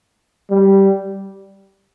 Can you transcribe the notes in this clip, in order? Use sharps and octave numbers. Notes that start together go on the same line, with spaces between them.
G3